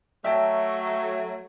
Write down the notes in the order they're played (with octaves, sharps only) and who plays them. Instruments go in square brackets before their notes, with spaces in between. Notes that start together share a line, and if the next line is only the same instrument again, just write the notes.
[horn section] F#3 A3 [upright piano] E5 G5 A5